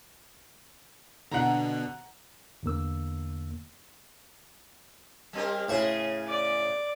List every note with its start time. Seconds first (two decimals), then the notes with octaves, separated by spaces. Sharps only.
1.31 B2 D3 F#5 A#5
2.63 E2 D3 A#3 E6
5.33 G3 C4 A#4
5.69 A2 C#3 G#4 C5 C#6
6.28 D5